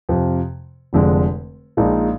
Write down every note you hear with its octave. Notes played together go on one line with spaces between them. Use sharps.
F2 C3 F3
F1 F2 D3 G#3 D4
A#1 A#2 G#3 D#4